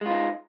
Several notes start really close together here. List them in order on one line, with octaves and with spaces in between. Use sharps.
G#3 F4 D#4